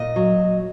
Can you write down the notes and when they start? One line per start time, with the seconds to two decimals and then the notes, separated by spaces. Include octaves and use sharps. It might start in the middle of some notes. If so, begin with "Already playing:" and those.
Already playing: A#2 D#5
0.16 F#3